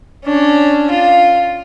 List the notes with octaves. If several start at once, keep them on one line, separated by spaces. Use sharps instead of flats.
C#4 D4
F4